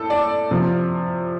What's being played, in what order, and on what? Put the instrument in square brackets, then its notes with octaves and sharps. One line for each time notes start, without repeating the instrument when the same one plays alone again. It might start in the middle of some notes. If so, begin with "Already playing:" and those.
Already playing: [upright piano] A2 A4
D5
C3 F3